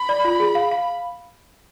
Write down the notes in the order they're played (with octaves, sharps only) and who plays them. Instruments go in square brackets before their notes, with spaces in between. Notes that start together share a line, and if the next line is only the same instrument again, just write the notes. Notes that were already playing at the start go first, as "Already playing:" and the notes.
Already playing: [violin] B5
[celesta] D5
F4
G#4
F5
F5